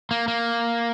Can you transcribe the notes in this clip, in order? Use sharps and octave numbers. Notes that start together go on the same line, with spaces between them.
A#3
A#3